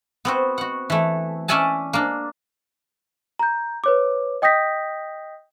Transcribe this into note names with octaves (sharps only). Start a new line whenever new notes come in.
B3 C4 F#4
F#4 F#5
E3 A3
C#4 D5 E5 F#5 G#5 A5
A#3 D4
A#5 G6
B4 C#5 D6
D#5 G5 D#6 G6 A#6 B6